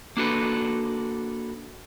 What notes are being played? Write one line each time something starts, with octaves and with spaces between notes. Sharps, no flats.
A#3 D4 F#4 A4 B4